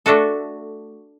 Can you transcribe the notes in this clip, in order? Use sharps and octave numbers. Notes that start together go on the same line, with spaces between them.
A3 D4 F#4 A4